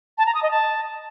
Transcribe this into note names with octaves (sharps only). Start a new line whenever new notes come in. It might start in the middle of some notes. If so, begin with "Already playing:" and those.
A5
A#5
D#6
D#5
A5